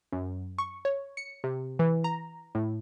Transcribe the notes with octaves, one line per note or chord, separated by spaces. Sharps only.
F#2
C#6
C#5
C#7
C3
E3
A#5
A2